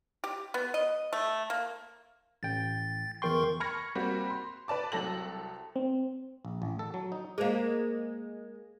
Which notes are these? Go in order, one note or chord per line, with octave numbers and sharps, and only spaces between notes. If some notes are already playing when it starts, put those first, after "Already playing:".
G4
B3
D#5
A3
A#3
A1 G5 A6
E2 E3 A#4 G5 C6 C#6
B5 C#6 F6 G#6 A#6 C#7
G3 A#3 C4 F#4
C6
B4 D5 A5 D6
C2 F#3 A4 A#6 F#7
C4
A#1
A1
A4
F#3
D#4
G#3 A#3 G#4 C5 F5